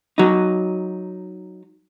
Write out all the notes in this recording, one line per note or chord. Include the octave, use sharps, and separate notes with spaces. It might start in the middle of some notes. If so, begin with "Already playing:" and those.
F#3 D#4